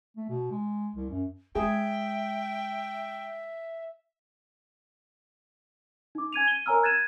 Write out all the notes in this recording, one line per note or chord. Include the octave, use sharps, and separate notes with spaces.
A3
B2
G#3
C2
F#2
G#3 G#4 E5 G5
D#4 D6
G#5 G#6 D#7 F7
D#7 G7
A#4 C#5 G#5 A#5 E6 F6
F#6 G#6 A6 D#7 E7